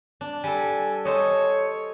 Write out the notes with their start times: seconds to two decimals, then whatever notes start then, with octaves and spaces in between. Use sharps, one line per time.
0.21 D4
0.44 G3 A4 G#5
1.05 A4 C5 C#5 D#5